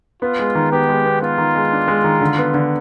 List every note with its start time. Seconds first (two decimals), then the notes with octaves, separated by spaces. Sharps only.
0.22 B3 F4
0.39 G#3
0.55 D#3
0.72 B3 G4
0.89 G#3
1.05 B3
1.22 B3 F4
1.38 D#3
1.55 G#3
1.72 D4
1.88 G#3
2.04 D#3
2.21 D3
2.38 B3
2.54 D3